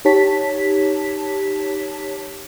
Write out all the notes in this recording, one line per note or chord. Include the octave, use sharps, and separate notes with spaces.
D#4 G4 C#5 A5 B6